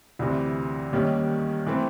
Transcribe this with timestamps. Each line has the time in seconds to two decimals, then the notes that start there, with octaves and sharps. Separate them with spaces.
0.19 D2 C3 E3
0.93 D#2 D#3 G3 A#3 C#4
1.67 E3 A3 C4